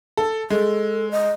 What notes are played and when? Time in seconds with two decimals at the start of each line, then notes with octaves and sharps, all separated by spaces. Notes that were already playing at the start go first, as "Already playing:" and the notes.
0.17 A4
0.50 G#3 A4
1.11 D#5